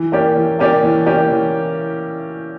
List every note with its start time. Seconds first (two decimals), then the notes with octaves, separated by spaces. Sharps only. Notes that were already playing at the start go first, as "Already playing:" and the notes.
Already playing: E3
0.12 A#3 C#4 G4 D5
0.36 E3
0.59 A#3 C#4 G4 D5
0.83 E3
1.06 A#3 C#4 G4 D5
1.30 E3